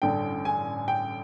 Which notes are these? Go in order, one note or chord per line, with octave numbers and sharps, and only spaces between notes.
A1 G2 D3 G5
G#5
G5